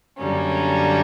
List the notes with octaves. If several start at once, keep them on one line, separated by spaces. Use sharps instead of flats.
F#2 D3 G3 A#3 C#4